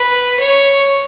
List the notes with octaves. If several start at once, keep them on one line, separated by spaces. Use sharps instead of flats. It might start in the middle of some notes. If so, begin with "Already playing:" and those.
Already playing: B4
C#5